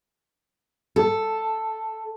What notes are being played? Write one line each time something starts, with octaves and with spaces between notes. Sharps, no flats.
A4